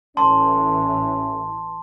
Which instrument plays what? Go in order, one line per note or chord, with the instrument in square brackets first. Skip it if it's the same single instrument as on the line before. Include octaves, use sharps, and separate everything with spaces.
[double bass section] A1 E3 [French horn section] A3 C#4 [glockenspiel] A5 C6